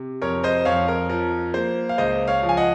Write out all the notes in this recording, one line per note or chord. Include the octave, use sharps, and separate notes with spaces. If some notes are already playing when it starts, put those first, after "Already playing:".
Already playing: C3
F2 A#4 C#5
C5 D#5
F2 C#5 F5
A#4
F3 A#4
A#3 C5
F5
C#2 C5 D#5
C#5 F5
F3
G#5
D#5 F#5